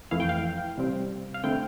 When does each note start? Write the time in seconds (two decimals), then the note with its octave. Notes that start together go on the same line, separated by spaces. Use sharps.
0.11 F2 E3 A3 E4 F5
0.20 G5
0.29 F5
0.78 C3 G3 C4
1.34 F5
1.44 D3 A3 C4 E4 G5